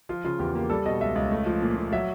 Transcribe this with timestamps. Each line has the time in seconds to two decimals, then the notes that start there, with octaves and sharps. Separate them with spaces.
0.09 F3 F4
0.25 C#3 F4
0.39 E2 G4
0.55 A#3 G4
0.70 G3 A4
0.86 B2 D#5
1.01 C#2 E5
1.16 C#2
1.31 A3
1.46 F3
1.62 A#2
1.77 A#2
1.92 F#3 E5